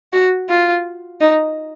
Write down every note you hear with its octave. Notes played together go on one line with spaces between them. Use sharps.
F#4
F4
D#4